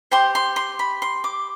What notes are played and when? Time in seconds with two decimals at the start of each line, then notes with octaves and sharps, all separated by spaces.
0.11 G4 C5 C6
0.35 C6
0.56 C6
0.79 B5
1.02 C6
1.24 D6